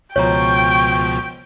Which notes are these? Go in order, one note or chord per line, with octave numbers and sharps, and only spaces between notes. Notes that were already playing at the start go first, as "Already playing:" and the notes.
C#2 B2 F3 C#5 G5 A#5 C#6